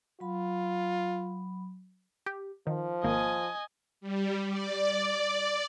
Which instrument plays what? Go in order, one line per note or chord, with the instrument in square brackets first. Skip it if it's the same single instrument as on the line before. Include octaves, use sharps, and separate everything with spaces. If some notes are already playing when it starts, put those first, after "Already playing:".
[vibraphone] F#3 B5 [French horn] F4
[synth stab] G4
[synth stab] D#3 [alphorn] F3
[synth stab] G#1 A#3 [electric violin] D#5 G#5
[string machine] G3
D5